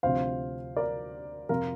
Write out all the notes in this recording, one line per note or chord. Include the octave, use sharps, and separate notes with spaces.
D2 C3 F3 C5 F5
A#4 D5
F2 C3 F3 F4 A#4